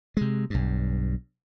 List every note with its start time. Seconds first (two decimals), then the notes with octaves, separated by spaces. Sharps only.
0.17 C3 G#3
0.50 B1 G2